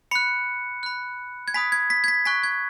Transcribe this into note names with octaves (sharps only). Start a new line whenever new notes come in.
B5 F#6 C#7
B5 F#6
G#6
G#5 B5 D#6 F#6 B6
G#6
B6
G#6
B6
G#5 C#6 F#6 B6
G#6